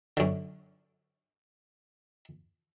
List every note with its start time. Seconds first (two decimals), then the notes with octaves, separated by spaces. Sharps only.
0.17 F#2 D3